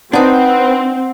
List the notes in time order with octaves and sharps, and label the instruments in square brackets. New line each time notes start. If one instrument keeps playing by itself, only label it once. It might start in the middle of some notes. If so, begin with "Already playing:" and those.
[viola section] C4 [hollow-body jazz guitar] D4 D#4 [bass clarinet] B4 [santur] F#5